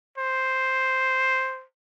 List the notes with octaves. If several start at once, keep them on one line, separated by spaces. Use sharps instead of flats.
C5